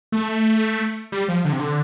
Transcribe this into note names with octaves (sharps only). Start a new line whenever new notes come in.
A3
G3
F3
D3
C3
D3